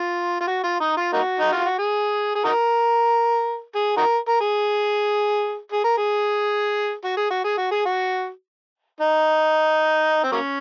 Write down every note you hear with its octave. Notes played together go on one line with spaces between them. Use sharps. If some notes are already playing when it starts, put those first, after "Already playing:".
Already playing: F4
F4
F#4
F4
D#4
F4
A#3 D#4 F#4
D#4
F4
F#4
G#4
G#4
D#4 F#4 A#4
G#4
D#4 F#4 A#4
A#4
G#4
G#4
A#4
G#4
F#4
G#4
F#4
G#4
F#4
G#4
F#4
D#4
C4
F#3 A#3 C#4